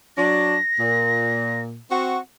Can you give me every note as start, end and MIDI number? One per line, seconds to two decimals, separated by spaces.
0.17 0.57 54
0.17 0.57 62
0.17 1.61 94
0.80 1.80 46
1.91 2.19 60
1.91 2.19 66